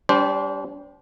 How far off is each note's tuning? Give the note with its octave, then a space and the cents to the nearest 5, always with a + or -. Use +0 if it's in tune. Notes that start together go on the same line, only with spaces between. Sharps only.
G3 +0 D4 -40 C5 +0